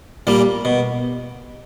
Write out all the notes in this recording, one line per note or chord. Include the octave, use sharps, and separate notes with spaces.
A#2 G3 A#3
B2